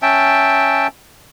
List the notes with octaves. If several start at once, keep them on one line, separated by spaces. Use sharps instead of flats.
C#4 E5 G5 A5